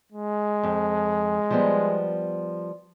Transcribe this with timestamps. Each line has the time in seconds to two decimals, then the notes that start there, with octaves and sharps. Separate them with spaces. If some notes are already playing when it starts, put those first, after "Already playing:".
0.12 G#3
0.63 F2
1.51 F3 G3 B3